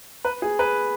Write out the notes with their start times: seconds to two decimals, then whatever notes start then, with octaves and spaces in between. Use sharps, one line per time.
0.25 B4
0.42 G#4
0.59 B4